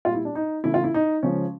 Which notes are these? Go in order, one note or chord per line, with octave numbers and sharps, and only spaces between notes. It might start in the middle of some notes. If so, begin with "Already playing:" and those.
A#2 G3 F4
E4
D4
D#4
C#3 E3 A3 E4
F4
E4
D#4
C#3 F3 G#3 C#4